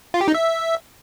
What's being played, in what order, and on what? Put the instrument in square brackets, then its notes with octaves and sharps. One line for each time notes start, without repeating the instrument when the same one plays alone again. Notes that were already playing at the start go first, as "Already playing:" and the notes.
[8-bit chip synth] F4
G4
D#4
E5